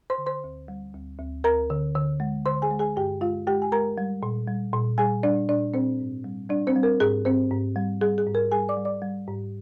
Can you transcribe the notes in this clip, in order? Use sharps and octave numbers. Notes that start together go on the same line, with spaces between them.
C5 C6
D3
C5 C6
D2
G3
D2
D2
D2 A#4 A#5
D3
D3
G#3
D3 C5 C6
G#4 G#5
G#3
G#4 G#5
G2 G4 G5
G#3 F4 F5
G#3 G4 G5
G#5
G#3 A#4 A#5
G3
A#2
G3
A#2
G3 G#4 G#5
G3 D4 D5
A#2 D4 D5
A#2 C4 C5
G#2
G3
G3 D4 D5
C4 C5
G3
A#4
G#2 G#4
G#2 C4 C5
G#2
G3
G3 G#4
G#4
G#2
A#4
G3 G#4 G#5
D5 D6
G3
D5 D6
G3
G#2